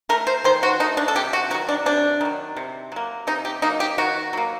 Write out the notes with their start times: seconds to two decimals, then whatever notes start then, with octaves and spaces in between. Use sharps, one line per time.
0.09 A3 A#4
0.27 C5
0.44 D#3 C5
0.63 F#4
0.80 A3 D#4
0.97 D4
1.08 A4
1.15 C3 G4
1.33 F#4
1.50 F#3 F#4
1.54 D#3
1.69 D4
1.86 C3 D4
2.21 D#3 F#3
2.56 C3
2.92 F#3 A#3
3.27 C3 D#4
3.45 G4
3.62 F#3 A#3 D#4
3.80 G4
3.98 D#3 F#4
4.33 F#3 A#3